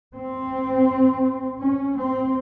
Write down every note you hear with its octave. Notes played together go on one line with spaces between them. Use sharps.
C4
C#4
C4